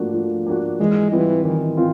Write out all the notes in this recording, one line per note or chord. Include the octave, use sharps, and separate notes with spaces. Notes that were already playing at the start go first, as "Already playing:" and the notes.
Already playing: F3 A3 A#3 D4 F#4
F3
A#3 D4 F#4
E3 G#3
E3 G3 C4 F4
D#3 E3
C4 F4